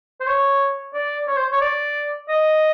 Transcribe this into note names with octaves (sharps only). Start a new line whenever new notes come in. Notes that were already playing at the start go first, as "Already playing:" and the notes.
C5
C#5
D5
C#5
C5
C#5
D5
D#5